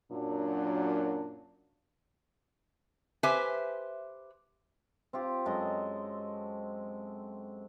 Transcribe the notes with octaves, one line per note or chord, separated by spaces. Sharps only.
F#2 A#2 F#3 D4
G4 B4 C5 E5 G#5
C4 F4 G4
F#2 G#3 A4 D#5